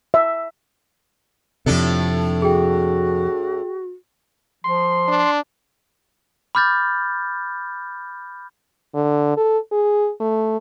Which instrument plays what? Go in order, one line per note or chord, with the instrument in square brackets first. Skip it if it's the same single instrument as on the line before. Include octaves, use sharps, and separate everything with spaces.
[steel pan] E5
[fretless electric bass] F2 C3 [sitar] A2 D4 A4
[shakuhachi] F#4 [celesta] G#4 G5
[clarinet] F3 [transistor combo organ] C6
[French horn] D4
[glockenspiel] B5 D6 F6 G6 A6
[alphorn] D3
A4
G#4
A3